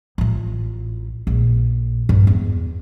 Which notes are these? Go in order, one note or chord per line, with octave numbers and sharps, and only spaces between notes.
A1 F4
A#1
G2 D4
E2